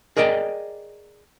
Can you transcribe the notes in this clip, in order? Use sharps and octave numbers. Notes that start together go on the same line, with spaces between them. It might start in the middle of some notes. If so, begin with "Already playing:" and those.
G#4 A#4 D5 D#5 G5